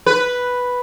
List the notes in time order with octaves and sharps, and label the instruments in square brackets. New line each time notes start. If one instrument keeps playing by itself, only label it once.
[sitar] B4